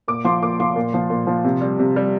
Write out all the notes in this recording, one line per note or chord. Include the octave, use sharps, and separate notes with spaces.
A#2 D6
F3 C6
A#2 D6
F3 C6
A#2
F3
A#2
F3
C3
G3
C3
G3